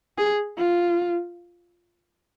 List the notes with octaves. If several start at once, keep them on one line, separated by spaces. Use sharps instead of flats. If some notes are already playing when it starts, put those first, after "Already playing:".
G#4
F4